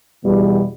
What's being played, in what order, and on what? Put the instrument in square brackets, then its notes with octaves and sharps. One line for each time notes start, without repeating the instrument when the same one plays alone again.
[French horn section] E2 B2 G3